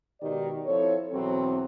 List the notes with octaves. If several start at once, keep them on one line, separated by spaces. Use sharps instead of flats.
G#2 B2 D#3 G4 D5 D#5
F3 C4 E4 A4 C#5
E2 B2 F#3 C4